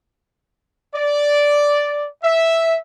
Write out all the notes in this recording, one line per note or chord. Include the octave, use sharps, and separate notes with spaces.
D5
E5